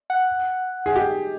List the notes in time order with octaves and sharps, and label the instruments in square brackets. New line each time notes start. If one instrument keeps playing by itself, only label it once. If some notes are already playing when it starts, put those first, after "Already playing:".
[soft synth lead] F#5
[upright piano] G#4
G4